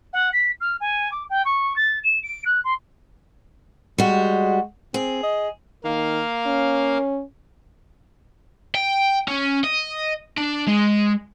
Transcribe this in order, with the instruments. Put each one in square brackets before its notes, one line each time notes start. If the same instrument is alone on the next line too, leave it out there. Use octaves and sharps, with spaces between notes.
[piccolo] F#5
B6
F6
G#5
D6
G5
C#6
A6
E7
D7
F#6
C6
[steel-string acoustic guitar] G3 F#4 [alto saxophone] G#3
[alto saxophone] C4 [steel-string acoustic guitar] G#4
[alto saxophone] D#5
[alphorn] D#3 [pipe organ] A#3 F5
[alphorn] C#4
[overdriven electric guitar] G5
C#4
D#5
D4
G#3